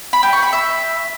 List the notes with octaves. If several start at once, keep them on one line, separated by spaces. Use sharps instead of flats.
B5
G5
C#6
B5
E5